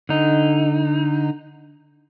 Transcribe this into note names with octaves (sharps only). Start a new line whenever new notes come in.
D3 D#4